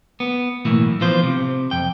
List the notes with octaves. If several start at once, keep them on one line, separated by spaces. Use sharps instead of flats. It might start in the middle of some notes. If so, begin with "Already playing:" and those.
B3
B1 A2 E3 A#3
E3 F3 B3 F4 C5
C3
F2 G5